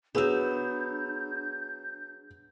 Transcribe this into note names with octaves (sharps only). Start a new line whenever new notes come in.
F#3 B3 D4 G#4 E6 G6